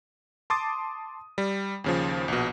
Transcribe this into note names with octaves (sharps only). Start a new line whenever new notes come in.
A5 C6 D6 D#6 A6
G3
D#2 C#3 F3
A#1 B2